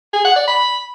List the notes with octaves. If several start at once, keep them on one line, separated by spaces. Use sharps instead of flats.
G#4
F#5
D5
B5